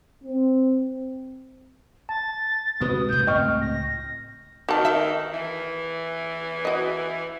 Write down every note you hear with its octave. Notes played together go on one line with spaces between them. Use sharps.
C4
A5 A6
D2 C3 G#3 B3 F#4 B4 D#6
G2 A3 G6
C#2 A2 C4 D#5 G5 C#6 F6
A#6
D#3 F#4 A5
E5
E3
F#4 D#5